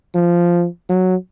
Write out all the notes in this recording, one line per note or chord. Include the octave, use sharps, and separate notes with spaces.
F3
F#3